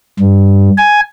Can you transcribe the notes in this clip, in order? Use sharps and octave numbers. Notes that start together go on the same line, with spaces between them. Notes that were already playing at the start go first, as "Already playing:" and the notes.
G2
G#5